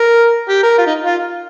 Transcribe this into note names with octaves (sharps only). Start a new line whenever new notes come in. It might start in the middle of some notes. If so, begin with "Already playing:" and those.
Already playing: A#4
G4
A#4
F4
D#4
F4